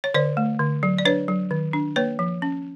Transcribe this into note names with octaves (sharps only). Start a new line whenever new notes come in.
C#5
D3 C5 D5
A3
D3
F#3
D5
D4 B4 C#5
F#3
D#3
D4
A#3 B4 C#5
F3
C#4